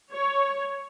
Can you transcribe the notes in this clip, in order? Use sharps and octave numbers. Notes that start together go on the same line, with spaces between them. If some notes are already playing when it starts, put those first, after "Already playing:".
C#5